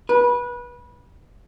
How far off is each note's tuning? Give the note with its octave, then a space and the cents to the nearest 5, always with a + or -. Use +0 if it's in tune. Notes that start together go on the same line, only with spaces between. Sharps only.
B4 -25